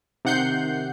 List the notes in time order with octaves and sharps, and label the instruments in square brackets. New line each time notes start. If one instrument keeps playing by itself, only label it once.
[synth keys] C3 D#3 F#5 G6 C7